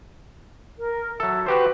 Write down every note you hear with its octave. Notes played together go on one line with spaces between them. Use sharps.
A#4
F#3 A4 E5
F#4 G4 B4 C5